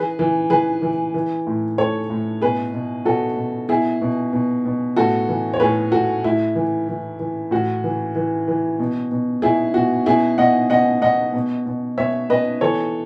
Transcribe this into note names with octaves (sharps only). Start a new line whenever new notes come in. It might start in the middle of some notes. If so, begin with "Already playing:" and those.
Already playing: E3 G#4 B4
E3
E3 G#4 B4
E3
E3
A2
A2 A4 C#5
A2
B2 G#4 B4
B2
B2 F#4 A4
B2
B2 E4 G#4
B2
B2
B2
A2 F#4 A4
E3
C#5
A2 G#4 B4
A2 F#4 A4
A2 E4
E3
E3
E3
A2 F#4
E3
E3
E3
B2
B2
B2 E4 G#4
B2 F#4
B2 E4 G#4
B2 D#5 F#5
B2 D#5 F#5
B2 D#5 F#5
B2
B2
B2 C#5 E5
B2 B4 D#5
E3 A4 C#5